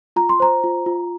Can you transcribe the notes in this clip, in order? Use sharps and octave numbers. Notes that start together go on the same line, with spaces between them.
F4 A#5
C6
C5 A#5
F4
F4